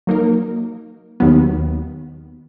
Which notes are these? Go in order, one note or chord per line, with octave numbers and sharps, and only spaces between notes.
F#3 A#3 D#4 A#4
D#2 D#3 F#3 B3